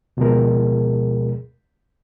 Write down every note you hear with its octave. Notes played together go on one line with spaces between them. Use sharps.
D2 B2 F3 G#3 G#4 A#4